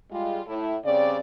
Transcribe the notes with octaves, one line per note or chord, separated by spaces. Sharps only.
G3 G#3 F4
A2 E4
C#3 G3 C4 D5